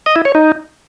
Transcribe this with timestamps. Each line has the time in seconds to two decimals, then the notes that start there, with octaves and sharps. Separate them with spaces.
0.06 D#5
0.16 E4
0.25 C#5
0.35 D#4